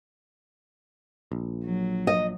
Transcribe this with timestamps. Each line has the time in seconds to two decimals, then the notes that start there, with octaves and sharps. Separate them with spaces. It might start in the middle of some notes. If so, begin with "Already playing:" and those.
1.32 A#1
1.65 F#3
2.07 D#5